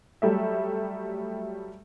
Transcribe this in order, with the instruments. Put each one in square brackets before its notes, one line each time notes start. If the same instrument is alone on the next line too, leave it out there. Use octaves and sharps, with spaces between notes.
[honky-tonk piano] F#3 G3 A3 E5